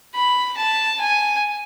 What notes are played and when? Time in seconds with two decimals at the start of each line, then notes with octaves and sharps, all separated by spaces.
0.15 B5
0.57 A5
1.00 G#5